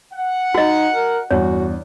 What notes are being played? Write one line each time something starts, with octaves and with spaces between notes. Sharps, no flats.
F#5
D#4 F#4 D#5
A#4
E2 G2 F#4 C#5